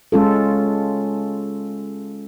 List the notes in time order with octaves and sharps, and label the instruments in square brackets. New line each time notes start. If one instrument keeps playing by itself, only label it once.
[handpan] G#3 C#4 F4 A4